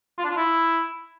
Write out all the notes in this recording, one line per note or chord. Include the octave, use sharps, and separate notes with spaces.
F4
D4
F4
E4